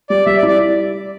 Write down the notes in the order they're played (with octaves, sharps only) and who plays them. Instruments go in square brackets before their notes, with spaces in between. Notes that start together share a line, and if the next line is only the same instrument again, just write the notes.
[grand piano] G3 [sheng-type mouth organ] D5
[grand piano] G3 [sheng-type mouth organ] E5
[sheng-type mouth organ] D5
[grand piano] E4
[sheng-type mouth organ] D5